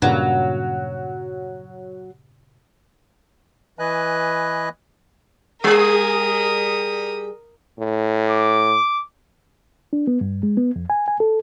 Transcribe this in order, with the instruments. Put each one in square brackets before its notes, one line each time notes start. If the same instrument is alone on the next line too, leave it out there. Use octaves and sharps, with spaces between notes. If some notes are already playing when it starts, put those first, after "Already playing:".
[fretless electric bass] G2 A#2 C#3 [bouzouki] F#3
[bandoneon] E3 B4 D#5 G#5 F#6
[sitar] G3 G#4 [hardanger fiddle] A#4 D#6
[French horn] A2
[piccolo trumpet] D6
[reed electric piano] D4
B3
G2
G#3
B3
F2
G#5
G#5
A4